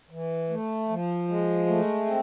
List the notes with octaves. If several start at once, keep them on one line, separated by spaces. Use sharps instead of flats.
E3
A3
F3
G#3
A3
C4